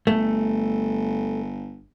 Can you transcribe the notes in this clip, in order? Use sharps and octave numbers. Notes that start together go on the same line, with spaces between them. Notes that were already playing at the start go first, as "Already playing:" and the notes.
G1 A3